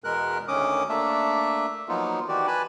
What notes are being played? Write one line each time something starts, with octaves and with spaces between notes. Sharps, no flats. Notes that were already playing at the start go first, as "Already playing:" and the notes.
E2 B2 G#3 A#4 F#6
D2 D#3 C#4 D6 D#6
A3 A#3 D4 E5
F3 F#3 A#3 B3 D#4 F4
D#3 E3 F#4 G4 D5
B4 G#5 A5 B5